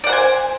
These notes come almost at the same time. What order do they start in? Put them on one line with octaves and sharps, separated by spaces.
D5 F#5 C5 G#5